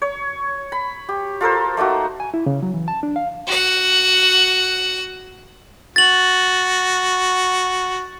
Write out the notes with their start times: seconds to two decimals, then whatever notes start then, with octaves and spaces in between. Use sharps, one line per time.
0.02 C#5
0.72 B5
1.09 G4
1.41 F4 A4 A#4 C5
1.77 A3 A#3 D#4 F#4
2.20 G#5
2.34 E4
2.46 C#3
2.63 F#3
2.74 E3
2.88 A5
3.03 D4
3.16 F5
3.47 F#4 F#5
5.96 F#4 A6 F#7